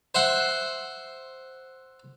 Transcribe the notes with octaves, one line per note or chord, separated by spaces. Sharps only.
C5 E5 F#5